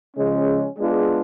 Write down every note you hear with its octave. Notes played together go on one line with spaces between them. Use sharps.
C#3 F3 G#3 C#4
G#3 B3 D4 F4 G#4